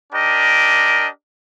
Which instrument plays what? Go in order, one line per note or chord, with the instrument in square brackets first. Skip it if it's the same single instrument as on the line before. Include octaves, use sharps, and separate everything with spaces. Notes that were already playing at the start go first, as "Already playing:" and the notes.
[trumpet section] D4 G4 A#4 D#5